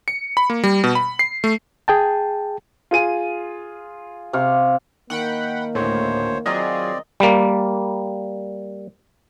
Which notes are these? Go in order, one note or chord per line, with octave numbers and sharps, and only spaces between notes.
C#7
B5
A#3
G3
B2
B5
C7
A3
G#4 G5 A5
F4 G#4 D#7
C3 F5 C#6
D#3 A#3 F#5 G5 B5
D2 A2 C5 C#5
F#3 C4 F4 G#4 D5 D#5 A#5
G3 A#3